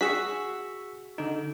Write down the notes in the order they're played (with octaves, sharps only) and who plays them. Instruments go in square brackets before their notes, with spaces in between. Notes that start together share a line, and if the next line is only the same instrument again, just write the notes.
[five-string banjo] F#4 G#4 [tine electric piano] C#6 E6 B6
[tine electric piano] D3 D#4